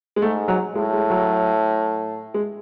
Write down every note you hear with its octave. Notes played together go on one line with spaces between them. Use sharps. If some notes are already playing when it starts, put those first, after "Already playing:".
G#3
G#2 A3
F#3
A2 G#3
G#3
F#3
G#3